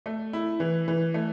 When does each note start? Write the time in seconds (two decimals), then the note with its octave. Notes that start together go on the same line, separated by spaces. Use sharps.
0.06 A3
0.33 E4
0.60 E3
0.88 E3
1.14 A3